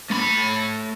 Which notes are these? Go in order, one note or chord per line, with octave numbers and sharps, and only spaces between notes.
A3 B5